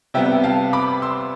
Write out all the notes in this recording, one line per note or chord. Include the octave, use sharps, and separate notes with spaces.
C3 G3 B3 E5 G5
G5
F5 A5
B5 D6
C6 E6